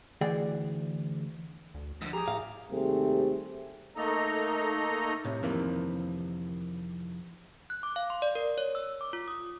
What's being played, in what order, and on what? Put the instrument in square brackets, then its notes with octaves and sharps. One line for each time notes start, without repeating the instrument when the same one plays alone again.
[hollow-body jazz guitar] D2 E3 G#4 D5 F#5 G5
[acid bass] D2
[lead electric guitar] G#2 D3 [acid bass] F3
[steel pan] G4 G#4 [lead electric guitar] A#5
[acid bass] A2 [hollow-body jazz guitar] F5
[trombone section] D#2 C3 G3 A3 C4 G#4
[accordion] A3 A#3 D#4 A4 D#5 A#5
[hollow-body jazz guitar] A2 C3
F2 C3 D#3 E3 A#3
[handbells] F#6
D6
F5
C6
D5
A#4
C#5
E6
D6
F4
D#6